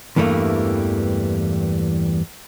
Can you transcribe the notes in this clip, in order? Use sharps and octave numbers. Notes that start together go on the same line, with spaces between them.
E2 G2 E3 G3 A3 A#3